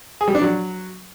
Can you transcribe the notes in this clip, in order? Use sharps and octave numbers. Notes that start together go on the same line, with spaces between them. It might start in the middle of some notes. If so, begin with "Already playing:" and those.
G#4
G3
D4
F#3